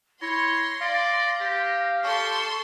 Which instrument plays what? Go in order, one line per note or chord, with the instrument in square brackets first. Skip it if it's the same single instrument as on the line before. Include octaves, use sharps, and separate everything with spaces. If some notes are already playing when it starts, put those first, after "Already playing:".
[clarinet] E4 [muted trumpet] C#5 [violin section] C6 [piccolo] A#6
[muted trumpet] D5 [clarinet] F5
[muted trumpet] G4
[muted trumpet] G4 [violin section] A4 C6 [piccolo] C#6